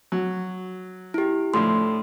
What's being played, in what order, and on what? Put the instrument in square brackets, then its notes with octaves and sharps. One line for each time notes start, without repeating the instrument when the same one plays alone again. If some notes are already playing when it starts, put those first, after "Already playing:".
[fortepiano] F#3
[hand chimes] E4 G4
[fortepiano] A2 D3 F3 [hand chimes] C6